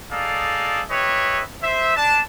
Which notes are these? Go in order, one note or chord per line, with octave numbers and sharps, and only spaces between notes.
D#4 G#4 A4 D5 F5
G4 B4 C#5 D#5 E5
C5 E5
D4 A5